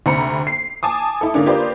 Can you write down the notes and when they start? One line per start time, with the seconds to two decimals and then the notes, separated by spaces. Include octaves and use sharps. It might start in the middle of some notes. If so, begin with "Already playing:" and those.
0.06 D2 C3 C4 A#5 B5 C#7
0.47 C7
0.83 G#5 A5 D6 D#6
1.21 E4 A4
1.34 D3 A#3 C#4 D4
1.46 A#3 F4 G4 B4 C5 D5